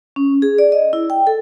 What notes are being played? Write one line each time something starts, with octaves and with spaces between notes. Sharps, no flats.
C#4
G#4
D5
D#5
E4
G5
A4